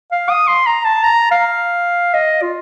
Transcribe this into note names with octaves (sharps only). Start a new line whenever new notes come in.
F5
D#6
C6
A#5
A5
A#5
F5
D#5
F4